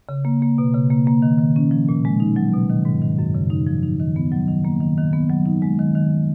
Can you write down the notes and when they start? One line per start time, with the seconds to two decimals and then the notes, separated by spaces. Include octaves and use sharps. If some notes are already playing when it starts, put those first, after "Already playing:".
0.09 C#3
0.25 A#3
0.42 A#3
0.58 B2
0.74 C#3
0.90 A#3
1.07 A#3
1.22 D#3
1.39 D#3
1.56 C#4
1.71 F3
1.89 A#2
2.05 G#3
2.20 D#4
2.36 F#3
2.54 B2
2.70 D#3
2.85 G#2
3.02 D#3
3.19 F#2
3.35 C#3
3.50 D#4
3.67 F3
3.83 D#4
4.00 D#3
4.16 B3
4.32 F#3
4.48 D#3
4.65 A#3
4.81 D#3
4.98 D#3
5.13 B3
5.30 F#3
5.46 D#4
5.62 G#3
5.79 D#3
5.95 D#3